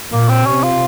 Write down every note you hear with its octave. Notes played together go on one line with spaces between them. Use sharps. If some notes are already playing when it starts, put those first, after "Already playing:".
A#2 A#3
C4
C3 C#4
F4